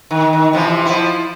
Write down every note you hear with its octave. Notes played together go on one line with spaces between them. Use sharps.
D#3
D#3
C3 E3 F3
F3 E4